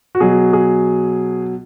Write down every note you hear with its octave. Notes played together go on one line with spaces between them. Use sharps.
F#4
B2 F#3 G#4
G#4